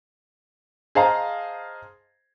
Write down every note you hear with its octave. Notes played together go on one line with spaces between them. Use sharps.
G#4 C5 D#5 F5 A5 A#5